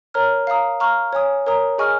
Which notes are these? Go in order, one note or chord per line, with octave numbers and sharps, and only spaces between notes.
A#4 C#5 A#5 F6
F5 A#5 D#6
F5 A#5 C#6 F6
C#5 G#5 D#6
A#4 C#5 A#5 D#6
G#4 D#5 G#5 C#6 F6